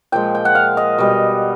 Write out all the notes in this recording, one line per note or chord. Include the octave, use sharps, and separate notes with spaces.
A#2 F3 G#3 G5
G5
F#5
F5
D#5
B2 G3